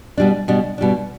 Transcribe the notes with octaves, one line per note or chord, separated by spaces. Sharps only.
B2 G3 D4
B2 G3 D4
B2 G3 D4